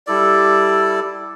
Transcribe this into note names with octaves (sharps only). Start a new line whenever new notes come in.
G3 E4 A4 D5